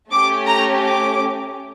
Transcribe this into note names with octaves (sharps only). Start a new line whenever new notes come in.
A3 C#4 G4 D6
A#5
D6